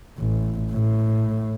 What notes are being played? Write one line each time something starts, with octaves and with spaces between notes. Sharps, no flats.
A1
A2